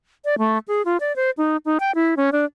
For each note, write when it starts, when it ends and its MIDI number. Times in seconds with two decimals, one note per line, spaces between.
0.25 0.35 74
0.39 0.58 57
0.68 0.82 68
0.85 0.97 65
1.00 1.15 74
1.16 1.31 72
1.38 1.57 63
1.65 1.78 63
1.80 1.91 79
1.95 2.15 64
2.17 2.30 61
2.32 2.45 62